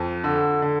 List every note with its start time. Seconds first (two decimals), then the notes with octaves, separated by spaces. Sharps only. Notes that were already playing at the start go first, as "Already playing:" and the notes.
Already playing: F2
0.24 D3
0.62 D3